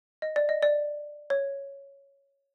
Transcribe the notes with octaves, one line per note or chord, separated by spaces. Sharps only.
D#5
D5
D#5
D5
C#5